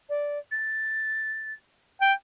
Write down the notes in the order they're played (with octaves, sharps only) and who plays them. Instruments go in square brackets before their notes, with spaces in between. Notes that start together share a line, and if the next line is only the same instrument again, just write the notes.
[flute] D5
A6
[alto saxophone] G5